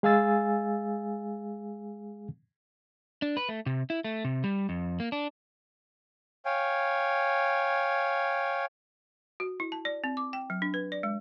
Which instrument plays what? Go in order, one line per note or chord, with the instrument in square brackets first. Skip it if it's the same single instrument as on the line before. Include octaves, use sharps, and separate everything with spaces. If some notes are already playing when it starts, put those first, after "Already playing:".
[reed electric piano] G#3 G#4 F5 G#5 E6 A6
[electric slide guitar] D4
B4
A3
C3
E4
A3
C3
G3
F2
A#3
D4
[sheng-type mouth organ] C#5 F5 G5 G#5
[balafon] F#4
E4
A5
D5
C4
D6
G5
F#3
D4
B4
D5
G#3